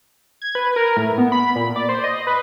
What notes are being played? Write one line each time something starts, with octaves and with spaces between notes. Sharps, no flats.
G#6
B4
A#4
A2
B3
B5
A#2
D5
C5
D#5
B4